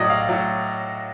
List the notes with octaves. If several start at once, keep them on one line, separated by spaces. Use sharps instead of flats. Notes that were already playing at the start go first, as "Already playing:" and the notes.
Already playing: A2 F#3 D5 D#5
F5
A2 F#3